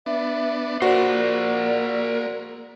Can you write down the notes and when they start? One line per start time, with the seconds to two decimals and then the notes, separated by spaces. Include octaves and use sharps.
0.06 B3 D4 E5
0.82 A#3 F#4 A#4 C5 D5